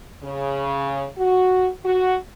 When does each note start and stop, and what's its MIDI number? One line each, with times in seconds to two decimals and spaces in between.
0.23 1.06 49
1.18 1.68 66
1.85 2.16 66